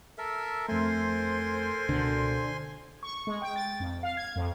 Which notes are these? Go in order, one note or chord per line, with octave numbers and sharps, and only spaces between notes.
A4 A#4 E5
F2 A3 A4 A#4 C5 G#5 C6
C#2 B2 D3
C#6
G#3
G5
A6
F2
F5
G#6
F2